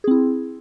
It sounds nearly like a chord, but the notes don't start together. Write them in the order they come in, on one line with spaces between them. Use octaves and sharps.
G#4 C4 E4